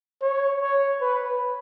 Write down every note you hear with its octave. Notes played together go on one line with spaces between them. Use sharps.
C#5
C#5
B4